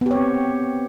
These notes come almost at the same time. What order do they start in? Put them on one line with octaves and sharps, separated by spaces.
B3 G4 C#5 C4